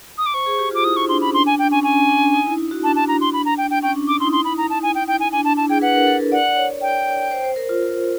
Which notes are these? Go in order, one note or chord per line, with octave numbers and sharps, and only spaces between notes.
D#6
D6
C5 C#6
G#4
G4
F4 D6
E4 D#6
D#4 C#6
D4 C6
C#4 B5
D4 C6
D4 G#5
D4 G5
C#4 G#5
C#4 G#5
D4
D#4
E4
E4
F#4
D4 A5
A5
A#5
C6
B5
A#5
G5
G5
C#4 G5
D4
D#4 D6
E4 C6
D#4
E4 C6
B5
A#5
A5
G#5
G5
G5
G#5
D4 G#5
D4 A5
E4 A5
G#4 G5
B4 F#5
A#4
A4
A#4
D5 F#5
C#5
G5
C5
C5
A#4
F4